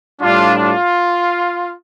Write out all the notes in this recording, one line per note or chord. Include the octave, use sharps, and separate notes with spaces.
A2 G3 D4 F4
F4